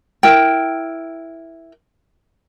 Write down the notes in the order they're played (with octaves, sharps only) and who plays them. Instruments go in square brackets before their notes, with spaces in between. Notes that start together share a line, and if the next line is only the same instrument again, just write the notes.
[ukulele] E4 A#4 G5